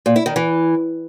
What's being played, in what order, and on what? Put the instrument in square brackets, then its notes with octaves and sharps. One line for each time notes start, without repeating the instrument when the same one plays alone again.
[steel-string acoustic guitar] A#2
E4
D#3
E3